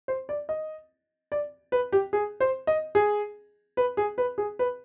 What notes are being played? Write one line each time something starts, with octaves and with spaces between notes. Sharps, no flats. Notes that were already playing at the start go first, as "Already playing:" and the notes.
C5
D5
D#5
D5
B4
G4
G#4
C5
D#5
G#4
B4
G#4
B4
G#4
B4